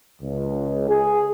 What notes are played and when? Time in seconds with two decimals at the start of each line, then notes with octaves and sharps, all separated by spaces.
0.22 C#2
0.89 G#4